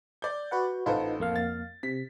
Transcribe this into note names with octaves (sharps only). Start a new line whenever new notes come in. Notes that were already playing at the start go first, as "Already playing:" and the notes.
D5 G6
F#4 B4 F#5
A1 D#4 F4 A4 B4 C5
F2 A#3 F5
A6
C3 B6